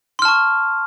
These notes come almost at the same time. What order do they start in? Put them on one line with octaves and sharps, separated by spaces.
C6 F6 A5 C#6